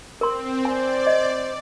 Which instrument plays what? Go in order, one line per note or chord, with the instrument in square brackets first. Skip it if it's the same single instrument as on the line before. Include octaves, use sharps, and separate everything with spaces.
[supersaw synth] C4 [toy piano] A#4 C6
[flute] C5 [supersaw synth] D5 [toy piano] G#5
[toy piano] D#5